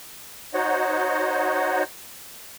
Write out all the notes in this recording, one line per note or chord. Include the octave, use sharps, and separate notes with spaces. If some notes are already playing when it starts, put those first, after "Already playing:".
D#4 F#4 C5 C#5 D#5 F#5